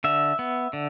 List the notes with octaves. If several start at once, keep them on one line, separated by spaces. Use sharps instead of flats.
D3 E5
B3
D3